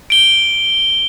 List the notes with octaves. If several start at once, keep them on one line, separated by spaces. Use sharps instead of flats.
D7 G7